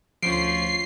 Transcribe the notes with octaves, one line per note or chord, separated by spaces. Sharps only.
D2 F3 C#4 F4 C7 D7